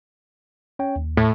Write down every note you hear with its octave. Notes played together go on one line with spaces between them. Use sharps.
C#4 C#5 G5
D#2
A2